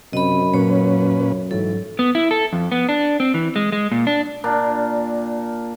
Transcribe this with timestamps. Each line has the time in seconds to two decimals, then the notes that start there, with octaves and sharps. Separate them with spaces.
0.13 F#2 C3 D#5 B5
0.54 A#2 F#3 C#4 B4 C#5
1.51 G#2 E3 F#3 A4
1.99 B3
2.15 E4
2.31 A4
2.53 F2
2.72 B3
2.89 D4
3.20 C4
3.34 E3
3.56 G#3
3.72 G#3
3.92 A#2
4.07 D4
4.44 A#2 D4 A#4